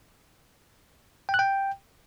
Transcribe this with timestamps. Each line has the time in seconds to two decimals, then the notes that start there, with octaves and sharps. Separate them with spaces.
1.29 G5
1.34 F#6
1.39 G5